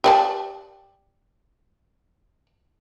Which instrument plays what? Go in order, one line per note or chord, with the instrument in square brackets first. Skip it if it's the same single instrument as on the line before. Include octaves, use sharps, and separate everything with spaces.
[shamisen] G4 D5 A5